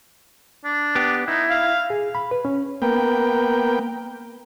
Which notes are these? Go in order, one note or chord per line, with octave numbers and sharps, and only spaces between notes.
D4
B3 G4
D#4 E4
F5
G#4
B5
B4
C#4
A#3 B3 G5